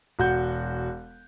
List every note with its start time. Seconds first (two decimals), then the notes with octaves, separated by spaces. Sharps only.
0.19 E1 F#4 F#5 G6